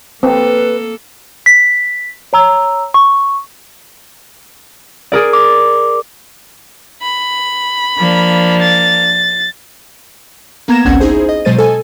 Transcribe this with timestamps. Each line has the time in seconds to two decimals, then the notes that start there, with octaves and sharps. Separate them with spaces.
0.23 A#3 C4 A4 B4
1.46 B6
2.33 C#5 A#5 E6
2.94 C#6
5.12 G#4 A#4 D5
5.33 D6
7.02 B5
7.97 F3 A#3 D4
8.62 A6
10.68 A#3 B3 A#5 G#6 A#6 E7
10.85 G#1 C#2 C4 C#4 F#5 G#6
11.00 D#4 E4 G#4 C5
11.29 D#5
11.45 B2 F#3 G#3 C5 A6 D#7
11.58 A4 D#5 G#5